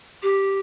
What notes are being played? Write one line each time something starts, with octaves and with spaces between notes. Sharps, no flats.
G4